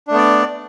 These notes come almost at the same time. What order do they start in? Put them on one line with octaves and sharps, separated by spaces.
D4 A3 B3 D5